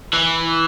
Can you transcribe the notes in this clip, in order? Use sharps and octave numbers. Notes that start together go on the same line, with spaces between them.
E3